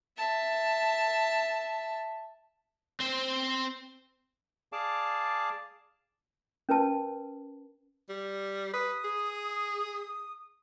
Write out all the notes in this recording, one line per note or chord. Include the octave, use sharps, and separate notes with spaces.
E5 A5
C4 C5
G#4 D5 F5 A5 D6
C#4 A#4 B4 A5
G3
B4 D#6
G#4